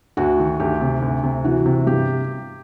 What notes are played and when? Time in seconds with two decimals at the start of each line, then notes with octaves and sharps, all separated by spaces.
0.17 D2 F#4
0.39 D#3
0.60 D2 G4
0.81 C3
1.02 D2
1.24 C3
1.44 E3 F#4
1.66 C3
1.87 G2 G4